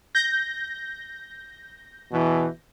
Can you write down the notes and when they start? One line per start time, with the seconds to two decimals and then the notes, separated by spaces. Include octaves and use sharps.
0.15 G6 A#6
2.12 E2 B2 E3